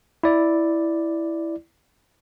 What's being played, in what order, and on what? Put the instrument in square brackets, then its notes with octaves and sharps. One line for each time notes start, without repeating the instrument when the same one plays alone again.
[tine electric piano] E4 D5